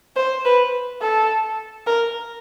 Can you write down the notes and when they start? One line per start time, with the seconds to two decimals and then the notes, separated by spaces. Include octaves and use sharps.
0.16 C5
0.45 B4
1.02 A4
1.87 A#4